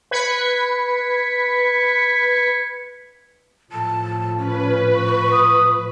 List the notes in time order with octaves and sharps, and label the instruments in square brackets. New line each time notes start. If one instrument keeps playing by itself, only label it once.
[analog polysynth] B4 G#6 B6 C#7
[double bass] A2 F3 [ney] A5
[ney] C#4 [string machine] B4
[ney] C#6
[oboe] D#6